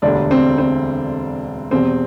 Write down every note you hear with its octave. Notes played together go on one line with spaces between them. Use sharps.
E1 D2 D3 G3 D4
C4
C4
E2 B2 G3 C4